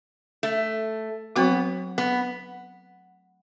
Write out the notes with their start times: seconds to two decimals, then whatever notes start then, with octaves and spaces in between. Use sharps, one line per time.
0.43 A3
1.36 F#3 B3 C4 F#4
1.98 B3